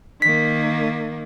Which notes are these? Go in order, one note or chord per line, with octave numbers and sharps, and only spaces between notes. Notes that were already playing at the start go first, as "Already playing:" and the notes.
D#3 A#3 B6